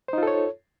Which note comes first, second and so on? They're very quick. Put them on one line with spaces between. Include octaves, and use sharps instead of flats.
C5 D#4 F4 A4 C#5